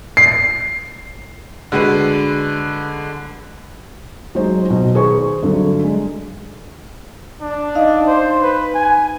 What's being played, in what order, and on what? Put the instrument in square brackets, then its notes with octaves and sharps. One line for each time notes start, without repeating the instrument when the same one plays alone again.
[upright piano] C7
D3 G#3 F#4 B4
[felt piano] F#3 G#3 D#4 C5
B2 F#3
D#3 G#4 B4 C5 C#6
G2 D3 F#3 A3
G#3
[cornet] D4
[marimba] D#4 D#5 F5
[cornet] C5
B4
G#5